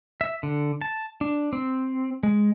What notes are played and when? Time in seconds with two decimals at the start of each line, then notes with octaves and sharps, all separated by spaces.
0.21 E5
0.43 D3
0.81 A5
1.21 D4
1.53 C4
2.23 G#3